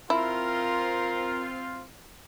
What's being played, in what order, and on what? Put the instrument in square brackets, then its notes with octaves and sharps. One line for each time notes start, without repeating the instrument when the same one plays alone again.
[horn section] C4 F4 [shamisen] E4 [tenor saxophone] A#4